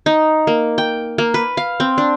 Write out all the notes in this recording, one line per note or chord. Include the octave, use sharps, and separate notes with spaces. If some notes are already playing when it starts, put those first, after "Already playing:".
D#4
A#3
G5
A#3
B4
F5
C4
D4